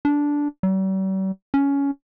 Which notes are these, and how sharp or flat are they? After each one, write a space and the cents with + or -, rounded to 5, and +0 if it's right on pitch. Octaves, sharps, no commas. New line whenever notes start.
D4 -10
G3 -45
C#4 +15